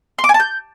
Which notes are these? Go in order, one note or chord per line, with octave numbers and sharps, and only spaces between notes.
C6
D6
G#5
A5
G6